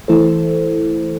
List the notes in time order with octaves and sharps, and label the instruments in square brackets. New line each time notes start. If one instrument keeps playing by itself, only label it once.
[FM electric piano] E3 A3 E4 A4 C5